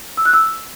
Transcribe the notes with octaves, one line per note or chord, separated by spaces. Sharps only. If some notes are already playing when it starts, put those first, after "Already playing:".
E6
F#6
E6